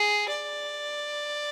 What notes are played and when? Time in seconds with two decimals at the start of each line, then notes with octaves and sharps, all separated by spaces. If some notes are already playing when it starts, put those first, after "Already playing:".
Already playing: G#4
0.29 D5